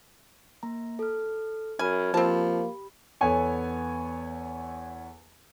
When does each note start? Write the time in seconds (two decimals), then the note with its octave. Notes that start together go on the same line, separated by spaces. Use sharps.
0.63 A#3 A#5
0.99 A4 F6
1.79 F#2 G#5 B5 F6 G#6
2.14 F3 A#3 C4 G4 A5 B5
3.21 E2 B3 A4 C#5 G#5 C#6